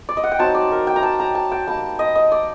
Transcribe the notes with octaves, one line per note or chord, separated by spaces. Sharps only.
D5
D#5
F#5
G5
F#3 C4 D#4 A5
D5
A#4
G5
A#5
A5
A#5
A5
G5
G3 A#3 D#4 A5
D#5
D#5
D5